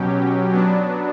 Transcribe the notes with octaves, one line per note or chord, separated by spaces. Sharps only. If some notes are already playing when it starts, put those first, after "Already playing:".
Already playing: B2 F#3 C#4 G4
F#3 B3 D4